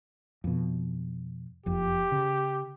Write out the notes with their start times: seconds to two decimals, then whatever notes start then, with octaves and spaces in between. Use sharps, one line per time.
0.44 F2 B2
1.66 F#1 F2 G4
2.12 C#3